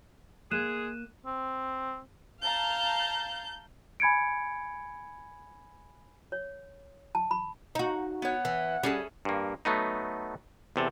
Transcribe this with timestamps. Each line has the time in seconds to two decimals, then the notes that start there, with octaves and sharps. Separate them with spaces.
0.51 G#3 A#3 G#4 F#6 D#7 E7
1.26 C4
2.42 F5 A5 A#5 G6
4.00 G#5 B5 G#6 C#7 D7
6.32 C#5
7.15 A5
7.31 B5
7.75 D#4 F#4
8.22 B3 C#5 F#5
8.45 E3
8.83 G3 C#4 G#4 A4
9.25 G2 A#3
9.65 F#3 A3 B3 D#4
10.76 E2 C3 A4